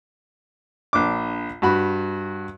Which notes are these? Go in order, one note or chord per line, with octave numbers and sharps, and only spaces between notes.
A#1 D4 D6
G2 F#4 B5